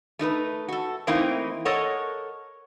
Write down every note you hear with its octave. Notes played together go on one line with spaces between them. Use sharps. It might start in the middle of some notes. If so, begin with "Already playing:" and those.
A3 D#4 A#4 B4
F#4 A4
E3 A3 A#3 C4 D#4 E4
A4 A#4 C#5 D#5 F#5